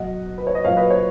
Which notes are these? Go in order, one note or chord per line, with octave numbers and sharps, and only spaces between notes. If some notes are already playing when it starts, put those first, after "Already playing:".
Already playing: B2 F#3 D#5 F#5
B4
C#5
D#5
A#2 F#3 C#5 F5
B4 D#5
C#5